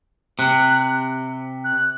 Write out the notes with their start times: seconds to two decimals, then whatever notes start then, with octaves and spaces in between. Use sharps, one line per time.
0.39 C3 F#6
1.64 F#6